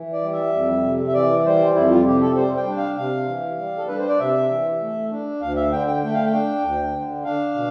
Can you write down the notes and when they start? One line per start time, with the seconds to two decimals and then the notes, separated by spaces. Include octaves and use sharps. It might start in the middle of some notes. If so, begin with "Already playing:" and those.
Already playing: E3
0.13 D5
0.22 G3
0.32 E5
0.53 F2
0.84 C3
1.08 E5
1.13 E3 D5
1.45 G3 C5
1.75 F2 E4
1.90 F4
2.06 C3 G4
2.21 A4
2.36 G3 C5
2.57 G5
2.67 D4
2.77 F5
2.97 C3 F5
3.28 E3
3.59 G3
3.77 A4
3.88 D4 B4
3.99 C5
4.08 D5
4.19 C3 E5
4.50 E3
4.80 A3
5.11 D4
5.41 D2 F5
5.56 E5
5.72 D3 G5
5.87 G5
6.02 A3 G5
6.14 F5
6.25 G5
6.33 D4
6.63 D2
6.94 D3
7.24 D4 F5
7.55 B2